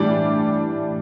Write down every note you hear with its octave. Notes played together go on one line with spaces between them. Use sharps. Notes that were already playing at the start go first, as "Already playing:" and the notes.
Already playing: A2 E3 G3 D4 D5